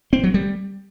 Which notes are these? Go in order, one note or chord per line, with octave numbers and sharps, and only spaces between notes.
C4
F#3
G3